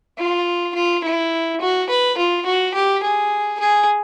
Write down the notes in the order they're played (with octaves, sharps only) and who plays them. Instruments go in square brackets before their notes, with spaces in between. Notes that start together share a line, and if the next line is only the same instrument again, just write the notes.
[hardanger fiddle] F4
F4
E4
F#4
B4
F4
F#4
G4
G#4
G#4